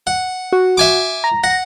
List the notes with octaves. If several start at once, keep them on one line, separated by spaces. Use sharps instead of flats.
F#5
F#4
E5 G#5 D6
A#5
F#5 A#6